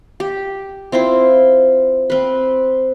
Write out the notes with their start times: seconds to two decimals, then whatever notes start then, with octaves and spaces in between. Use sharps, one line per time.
0.20 G4
0.92 C4 E4 F4 C5
2.10 C4 B4